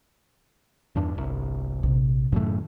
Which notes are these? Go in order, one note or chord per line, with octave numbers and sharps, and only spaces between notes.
E2 G2 D4
G1 C2
A#1 C3
F#2 A2 D#3 A3